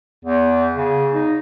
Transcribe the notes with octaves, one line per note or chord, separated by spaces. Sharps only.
E2
C#3
D#4